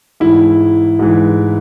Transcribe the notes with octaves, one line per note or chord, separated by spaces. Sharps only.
G#2 E3 E4
G#2 E3